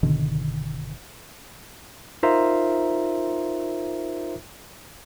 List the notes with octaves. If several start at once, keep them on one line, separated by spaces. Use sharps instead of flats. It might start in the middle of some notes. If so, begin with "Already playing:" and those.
F#1 B2 D3 D#3
D#4 F4 A#4 C5 E5 A#5